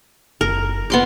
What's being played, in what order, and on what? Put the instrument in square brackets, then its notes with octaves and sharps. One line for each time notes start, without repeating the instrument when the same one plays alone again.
[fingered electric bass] F#1 [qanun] A#4
[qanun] B3 C6 D6